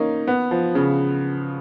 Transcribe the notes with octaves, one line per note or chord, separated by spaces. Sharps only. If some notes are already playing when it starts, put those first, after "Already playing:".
Already playing: A#3 C#4 D#4
B3
F3
C#3